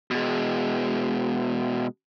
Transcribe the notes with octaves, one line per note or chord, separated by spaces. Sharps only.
B2 G#3